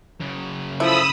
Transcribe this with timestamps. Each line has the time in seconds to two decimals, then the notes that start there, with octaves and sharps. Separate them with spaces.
0.21 F#2 C#3
0.80 F3 E4 A4 B5 D#6 E6